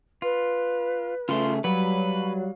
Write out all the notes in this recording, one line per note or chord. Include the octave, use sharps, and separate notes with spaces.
F4 B4
C#3 A3 F4 C6
F#3 G3 B4 F5 F#5